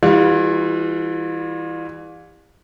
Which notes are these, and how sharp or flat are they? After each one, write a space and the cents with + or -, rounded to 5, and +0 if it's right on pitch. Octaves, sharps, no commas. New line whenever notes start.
E3 +0 G3 +35 F4 +35